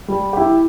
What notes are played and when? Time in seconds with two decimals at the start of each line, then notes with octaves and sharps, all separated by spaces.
0.08 G3
0.33 E4 G4